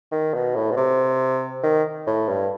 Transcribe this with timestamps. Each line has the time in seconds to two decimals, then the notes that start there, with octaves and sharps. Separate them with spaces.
0.12 D#3
0.34 B2
0.56 A2
0.71 B2
0.77 C3
1.63 D#3
2.07 A2
2.29 G2